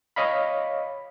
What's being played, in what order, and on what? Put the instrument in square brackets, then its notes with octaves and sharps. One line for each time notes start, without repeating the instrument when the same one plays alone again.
[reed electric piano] C#5 D#5 F5 B5